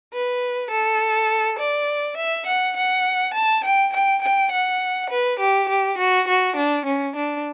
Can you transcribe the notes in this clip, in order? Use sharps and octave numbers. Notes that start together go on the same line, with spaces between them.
B4
A4
D5
E5
F#5
F#5
A5
G5
G5
G5
F#5
B4
G4
G4
F#4
F#4
D4
C#4
D4